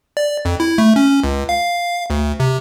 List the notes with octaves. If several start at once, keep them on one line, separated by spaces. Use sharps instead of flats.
D5
F2
E4
A3
C#4
C#2
F5
D2
C3